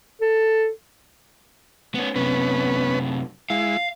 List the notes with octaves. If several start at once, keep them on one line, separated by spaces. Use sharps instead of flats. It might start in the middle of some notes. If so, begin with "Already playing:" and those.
A4
B3 C#4
F#2 C3 B3 C#4 B4
G#3 E4 F5